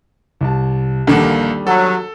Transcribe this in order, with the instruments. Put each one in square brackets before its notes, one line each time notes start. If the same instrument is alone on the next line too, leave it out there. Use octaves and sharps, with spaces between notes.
[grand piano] C2 A5
[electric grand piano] A#1 A#3 F#5 [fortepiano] D#2 D3 [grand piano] G3 D4
[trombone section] F#3 [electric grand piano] A4